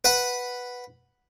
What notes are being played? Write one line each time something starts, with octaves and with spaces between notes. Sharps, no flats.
B4 F#5 B5